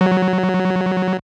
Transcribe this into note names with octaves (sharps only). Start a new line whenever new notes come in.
F#3